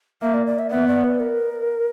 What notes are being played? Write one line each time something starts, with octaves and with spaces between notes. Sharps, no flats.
A#3 E5
D5
D5
E5
B3 E5
D5
B4
A#4